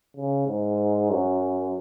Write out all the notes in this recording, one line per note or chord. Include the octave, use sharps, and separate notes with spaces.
C#3
G#2
F#2